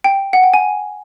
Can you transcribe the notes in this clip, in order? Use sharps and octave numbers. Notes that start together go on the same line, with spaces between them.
G5
F#5
G5
G#5